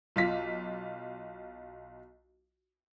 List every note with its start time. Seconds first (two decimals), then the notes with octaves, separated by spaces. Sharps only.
0.16 B1 F4 B6